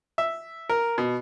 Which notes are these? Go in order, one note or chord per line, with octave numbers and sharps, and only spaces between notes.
E5
A#4
B2